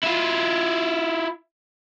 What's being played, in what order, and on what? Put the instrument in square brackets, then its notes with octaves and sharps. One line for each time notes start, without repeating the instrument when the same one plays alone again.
[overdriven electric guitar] E4 F4